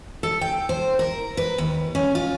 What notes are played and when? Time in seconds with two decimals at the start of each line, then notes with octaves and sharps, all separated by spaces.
0.23 A4
0.41 G5
0.69 C5
0.99 A#4
1.37 B4
1.58 D#2
1.95 C#4
2.15 F4